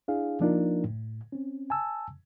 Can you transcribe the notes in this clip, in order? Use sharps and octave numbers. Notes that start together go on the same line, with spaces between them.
D4 E4 G#4 F5
F3 A#3 D4 D#4 F4 A#4
A2
C4 C#4
G#5 A5 E6